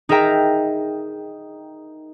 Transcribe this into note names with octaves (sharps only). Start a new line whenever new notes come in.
D#4 G#4 A#4 E5 G5 A#5